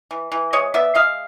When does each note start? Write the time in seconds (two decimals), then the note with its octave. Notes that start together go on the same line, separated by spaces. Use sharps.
0.11 E3
0.32 E3
0.53 G#3 C#5 D#5
0.74 B3 D5 E5
0.95 G#3 D#5 F5